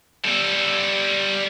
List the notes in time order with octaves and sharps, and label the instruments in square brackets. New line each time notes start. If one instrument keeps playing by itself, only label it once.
[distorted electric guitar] G3 A4